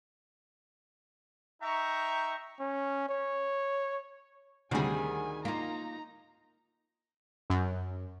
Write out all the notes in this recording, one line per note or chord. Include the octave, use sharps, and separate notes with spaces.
D#4 E5 G5 A#5 C#6
C#4
C#5
D2 C3 D#3 G3 G#4 G#5
A#3 D#4 F4 A#5
F#2